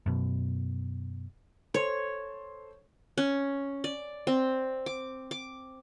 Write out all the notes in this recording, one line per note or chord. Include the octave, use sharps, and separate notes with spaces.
F#2 B2
A4 C5 C#5 C6
C#4
D5
C4
D6
D6